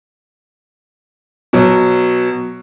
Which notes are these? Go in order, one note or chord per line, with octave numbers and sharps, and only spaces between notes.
B2 F#3